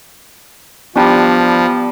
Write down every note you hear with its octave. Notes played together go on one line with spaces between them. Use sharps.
F3 G3 B3 D4 G4 A5